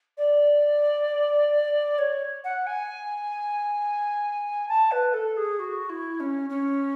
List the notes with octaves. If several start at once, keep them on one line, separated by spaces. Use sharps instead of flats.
D5
C#5
F#5
G#5
A5
B4
A4
G#4
F#4
E4
C#4
C#4